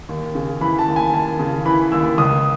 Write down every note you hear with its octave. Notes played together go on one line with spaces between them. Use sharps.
D#2
C#3
E3 B5
A5
D#2
G#5
D#2 A5
C#3
E3 B5
D#2 E6
C#2 D#6